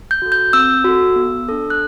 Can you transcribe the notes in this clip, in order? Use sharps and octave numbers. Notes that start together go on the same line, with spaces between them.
G6
F#4 A4
G6
C4 E6
F#4 A4
B3
D4 A4
F#6